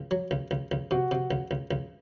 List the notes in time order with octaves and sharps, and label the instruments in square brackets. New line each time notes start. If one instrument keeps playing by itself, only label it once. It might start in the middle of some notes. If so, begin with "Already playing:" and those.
Already playing: [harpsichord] C#2
F#3
C#2
C#2
C#2
[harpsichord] C3 [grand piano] F#4
[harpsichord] C3
C#2
C#2
C#2